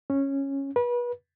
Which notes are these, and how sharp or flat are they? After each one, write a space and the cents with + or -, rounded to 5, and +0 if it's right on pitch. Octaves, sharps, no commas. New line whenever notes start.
C#4 -10
B4 -30